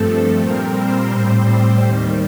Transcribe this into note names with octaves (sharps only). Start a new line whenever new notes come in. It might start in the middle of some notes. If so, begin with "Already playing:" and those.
Already playing: G2 F3 A3 C4 A4
A#2 G3 C4 A#4
C5
A2 G3 C4 C5
D#2 D#3 G3